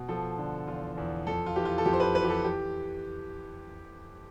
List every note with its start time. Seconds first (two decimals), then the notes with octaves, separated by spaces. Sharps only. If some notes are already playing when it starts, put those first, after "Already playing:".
Already playing: B2
0.09 F3 A4
0.38 D3
0.67 E2 F4
0.97 E2
1.27 F2 A4
1.46 F4
1.56 E3 G4
1.65 F4
1.78 A4
1.85 F2 G4
1.93 C5
2.00 B4
2.15 E3 B4
2.24 G4
2.30 A4
2.44 G4